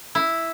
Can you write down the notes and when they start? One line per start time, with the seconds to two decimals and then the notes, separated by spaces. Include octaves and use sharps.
0.15 E4